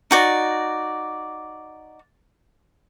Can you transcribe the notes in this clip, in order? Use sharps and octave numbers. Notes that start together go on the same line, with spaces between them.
D#4 F#4 D5